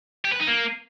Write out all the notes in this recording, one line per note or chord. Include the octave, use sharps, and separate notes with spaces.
G4
B4
D#4
A#3